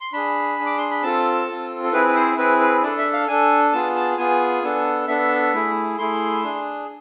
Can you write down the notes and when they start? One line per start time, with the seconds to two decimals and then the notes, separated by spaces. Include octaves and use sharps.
0.01 C6
0.13 D4 G#4 B5
0.58 D4 G#4
0.66 D6
0.78 C6
0.91 B5
1.03 C4 F4 A4 A5
1.48 C4 F4 A4
1.84 A4
1.92 C4 E4 G#4 B4
2.08 B4
2.15 C5
2.37 C4 E4 G#4 B4
2.60 B4
2.83 D4 A4 D5
2.98 E5
3.13 F5
3.28 D4 A4 G#5
3.73 B3 F4 G#4 A5
3.96 A5
4.18 B3 F4 G#4 G#5
4.63 B3 D4 A4
5.08 B3 D4 A4 E5
5.54 A3 E4 G#4
5.98 A3 E4 G#4 C6
6.44 D4 G#4